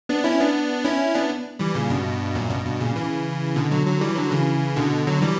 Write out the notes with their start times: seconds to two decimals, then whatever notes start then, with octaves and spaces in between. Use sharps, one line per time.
0.09 B3 D4
0.24 C#4 E4
0.40 B3 D4
0.85 C#4 E4
1.15 B3 D4
1.59 E3 G3
1.75 A#2 C#3
1.90 G2 B2
2.35 F#2 A#2
2.50 G2 B2
2.65 G2 B2
2.80 A#2 C#3
2.95 C#3 E3
3.56 B2 D3
3.71 D3 F#3
3.86 D3 F#3
4.01 E3 G3
4.16 D3 F#3
4.31 C#3 E3
4.76 B2 D3
5.07 D3 F#3
5.22 E3 G3